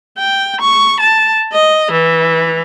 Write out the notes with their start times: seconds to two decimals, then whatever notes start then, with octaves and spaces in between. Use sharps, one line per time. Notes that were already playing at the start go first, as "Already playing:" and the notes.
0.19 G5
0.61 C#6
1.00 A5
1.53 D#5
1.91 E3